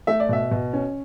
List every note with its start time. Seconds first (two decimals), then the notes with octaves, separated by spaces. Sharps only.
0.07 A3 E5
0.20 D5
0.29 B2 E5
0.51 B2
0.73 C#4